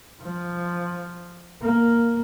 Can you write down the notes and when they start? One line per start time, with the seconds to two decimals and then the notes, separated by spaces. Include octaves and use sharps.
0.22 F3
1.62 A#3